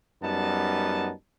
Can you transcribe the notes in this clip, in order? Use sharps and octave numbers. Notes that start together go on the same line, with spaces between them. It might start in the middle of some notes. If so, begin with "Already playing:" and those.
F#2 G3 B3 D#4 A5